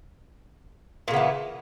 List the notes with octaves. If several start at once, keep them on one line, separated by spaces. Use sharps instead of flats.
A#2 C#3 E3 B3